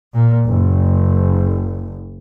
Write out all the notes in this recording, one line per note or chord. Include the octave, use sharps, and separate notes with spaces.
A#2
F#1